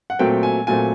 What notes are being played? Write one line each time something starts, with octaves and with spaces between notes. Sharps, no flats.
F#5
A#2 F#3 A3 C4 G5
G#5
A#2 F#3 A3 C4 G#5